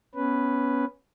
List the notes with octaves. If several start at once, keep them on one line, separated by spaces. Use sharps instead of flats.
B3 C#4 B4